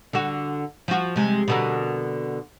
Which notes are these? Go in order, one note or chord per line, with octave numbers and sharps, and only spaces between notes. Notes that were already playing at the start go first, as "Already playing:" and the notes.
D3 F#4
F3 F#4
C3 G#3
B2 D3 A#4